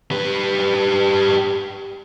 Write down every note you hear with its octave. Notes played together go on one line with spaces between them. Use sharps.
G3 B4